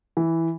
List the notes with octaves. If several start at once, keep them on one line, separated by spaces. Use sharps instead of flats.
E3